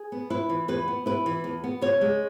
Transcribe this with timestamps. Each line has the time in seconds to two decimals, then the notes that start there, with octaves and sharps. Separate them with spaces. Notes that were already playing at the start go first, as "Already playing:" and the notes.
Already playing: G#4
0.12 B3
0.30 E4 B4
0.49 E3
0.68 E2 B4
0.88 B3
1.06 E4 B4
1.26 E3
1.44 E2
1.64 B3
1.81 C#3 C#5
2.01 G#3